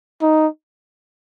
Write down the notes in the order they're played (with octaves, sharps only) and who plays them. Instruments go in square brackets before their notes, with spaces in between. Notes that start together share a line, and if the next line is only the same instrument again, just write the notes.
[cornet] D#4